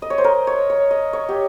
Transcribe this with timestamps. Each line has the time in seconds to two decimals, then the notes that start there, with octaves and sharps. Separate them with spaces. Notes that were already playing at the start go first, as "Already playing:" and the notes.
0.02 D#5
0.10 C#5
0.18 C5
0.24 A#4
0.47 C#5
0.70 C#5
0.91 D#5
1.13 C#5
1.29 G4